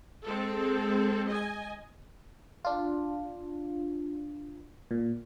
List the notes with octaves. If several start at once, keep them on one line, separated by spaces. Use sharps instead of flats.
G#3 C4 A4
D#5 G#5
D4 F4
A#2